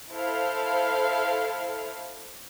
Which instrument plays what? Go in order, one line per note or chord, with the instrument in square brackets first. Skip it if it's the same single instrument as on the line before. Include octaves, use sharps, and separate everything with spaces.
[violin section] E4 A4 C5 F5